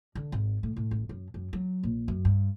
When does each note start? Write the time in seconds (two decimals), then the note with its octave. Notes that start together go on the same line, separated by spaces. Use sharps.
0.15 D3
0.32 G#1
0.63 A2
0.76 A2
0.91 A1
1.09 F#2
1.34 F#2
1.53 F#3
1.83 A#1
2.08 F#2
2.25 G2